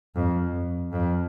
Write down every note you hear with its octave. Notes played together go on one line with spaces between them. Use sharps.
F2
F2